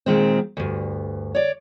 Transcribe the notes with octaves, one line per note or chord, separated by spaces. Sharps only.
A#2 D#3 G#3 C4
D2 G2
C#5 D5